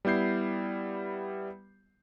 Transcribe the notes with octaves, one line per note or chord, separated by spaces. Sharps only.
G3 B3 E4 G6 C7